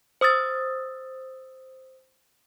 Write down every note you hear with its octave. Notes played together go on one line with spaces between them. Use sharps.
C5 D#6 E6 A6